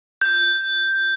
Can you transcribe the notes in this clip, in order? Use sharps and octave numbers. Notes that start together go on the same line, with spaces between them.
G6